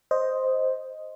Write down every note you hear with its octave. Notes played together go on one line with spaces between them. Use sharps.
C5 D#5